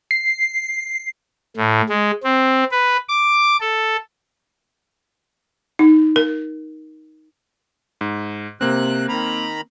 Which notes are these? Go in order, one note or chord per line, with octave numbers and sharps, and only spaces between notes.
C7
A2
G#3
C4
B4
D6
A4
D#4
A#4
G#2
C3 A#3 C4 F#6
D#3 A#5 B5